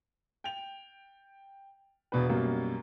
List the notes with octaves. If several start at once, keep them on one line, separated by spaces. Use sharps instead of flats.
G5 F7
E1 B2 D4 B4
F#2 B2 G3 A#3